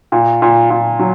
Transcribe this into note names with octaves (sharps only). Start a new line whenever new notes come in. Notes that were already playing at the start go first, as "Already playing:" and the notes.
A#2
A#2
A#2
F#3